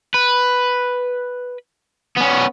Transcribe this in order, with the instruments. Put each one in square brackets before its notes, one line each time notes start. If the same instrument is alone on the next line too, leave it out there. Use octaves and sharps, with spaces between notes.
[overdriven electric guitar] B4
B3 C#4